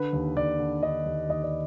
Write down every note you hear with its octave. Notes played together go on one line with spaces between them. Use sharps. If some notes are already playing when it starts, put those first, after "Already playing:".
Already playing: D3 B4
D#2
D#2 D5
D3
D3 D#5
D#2
D#2 D#5
D5